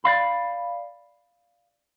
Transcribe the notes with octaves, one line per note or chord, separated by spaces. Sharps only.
D5 D#5 F5 B5